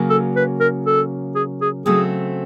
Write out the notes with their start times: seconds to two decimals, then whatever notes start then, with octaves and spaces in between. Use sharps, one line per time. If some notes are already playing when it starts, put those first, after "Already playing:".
Already playing: C#3 F#3 A#3
0.10 A4
0.36 B4
0.60 A#4
0.86 A4
1.35 G#4
1.62 G#4
1.86 C#3 F#3 A3 C4 G#4